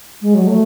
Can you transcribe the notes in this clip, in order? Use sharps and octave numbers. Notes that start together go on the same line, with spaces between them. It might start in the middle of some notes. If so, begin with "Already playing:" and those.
G#3
F#3
A3